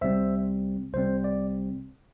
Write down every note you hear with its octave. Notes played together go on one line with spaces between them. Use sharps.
C2 C3 G3 C4 C5 E5
C2 C3 G3 C4 C5
D5